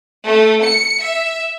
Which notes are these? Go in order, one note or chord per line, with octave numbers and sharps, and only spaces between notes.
A3
C#7
E5